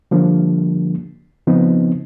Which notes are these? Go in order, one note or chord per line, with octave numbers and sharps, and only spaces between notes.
D3 F3 G3 A#3 D4
C#3 F3 B3 C4 D#4